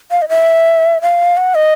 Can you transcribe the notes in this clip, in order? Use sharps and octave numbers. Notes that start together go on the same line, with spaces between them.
F5
D#5
E5
F5
F#5
D#5